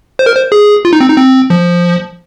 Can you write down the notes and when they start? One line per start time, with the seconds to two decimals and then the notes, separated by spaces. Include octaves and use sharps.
0.19 C5
0.26 A#4
0.35 C5
0.52 G#4
0.85 F4
0.93 D#4
1.01 C4
1.09 D#4
1.18 C4
1.50 F3